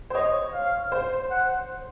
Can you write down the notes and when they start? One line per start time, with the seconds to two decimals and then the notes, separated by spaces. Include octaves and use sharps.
0.10 C5
0.15 C#5 D#5
0.52 F5
0.92 C5
1.30 F#5